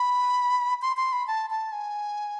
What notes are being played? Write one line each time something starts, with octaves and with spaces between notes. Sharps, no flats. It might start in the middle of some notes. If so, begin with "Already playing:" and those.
Already playing: B5
C6
C6
B5
A5
A5
G#5